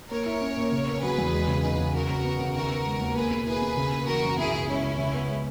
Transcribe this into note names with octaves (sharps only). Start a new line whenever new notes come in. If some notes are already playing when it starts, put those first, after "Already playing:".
A#3 A#4 C#5
E4
C#4
A#2
C#3
B3
F#3 G#4 B4
E2
G#3
C#3
D#4 G#4 B4
C#3
F#3 F#4 A#4
C#3
B3
C#3
D#3 F#4 A#4
B3
G#3
D#2
A#3 G#4 B4
B2
E4 G#4 B4
B2
C#3
A#3
E3 F#4 A#4
F#2
B2 E4 G#4
C#2
G#3 C#4 E4
C#2
C#3
B3
G#3